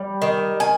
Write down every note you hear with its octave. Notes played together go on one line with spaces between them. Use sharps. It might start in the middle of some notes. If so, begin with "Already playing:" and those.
Already playing: G3
D#3
G#5